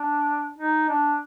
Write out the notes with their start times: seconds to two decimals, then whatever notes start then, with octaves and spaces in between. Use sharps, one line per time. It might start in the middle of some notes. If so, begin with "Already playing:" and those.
Already playing: D4
0.58 D#4
0.89 D4